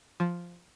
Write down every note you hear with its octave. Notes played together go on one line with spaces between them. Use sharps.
F3